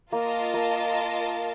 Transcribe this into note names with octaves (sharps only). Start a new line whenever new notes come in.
A#3 F4 A#4 D#5 A5
A#3